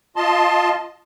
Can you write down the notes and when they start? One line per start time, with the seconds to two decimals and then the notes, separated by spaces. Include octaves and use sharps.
0.16 F4 D#5 A5 C6